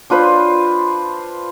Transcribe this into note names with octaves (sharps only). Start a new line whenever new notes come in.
D4 F4 B4 C5